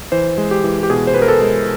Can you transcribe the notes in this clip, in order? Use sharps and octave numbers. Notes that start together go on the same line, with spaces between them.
E3 C5
G#3
G4
E3
G4
B2 G#4
C5
B2 B4
A#4
A4
G#3